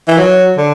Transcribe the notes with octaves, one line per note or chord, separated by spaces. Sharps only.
E3
F#3
D3